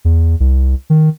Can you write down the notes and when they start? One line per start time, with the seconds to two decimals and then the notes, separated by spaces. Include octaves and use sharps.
0.05 E2
0.40 C2
0.90 D#3